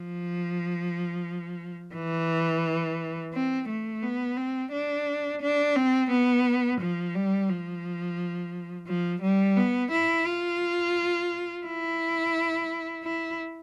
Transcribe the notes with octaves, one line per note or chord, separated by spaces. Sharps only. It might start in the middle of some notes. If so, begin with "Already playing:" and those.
Already playing: F3
E3
C4
A3
B3
C4
D4
D4
C4
B3
F3
G3
F3
F3
G3
B3
E4
F4
E4
E4